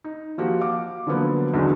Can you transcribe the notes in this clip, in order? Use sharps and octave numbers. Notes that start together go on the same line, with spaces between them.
D#4
F3 A#3 F#4 G4
F5 D6
D3 F3 F#3 A#3 B3
B1 E2 D3 F#3 G#3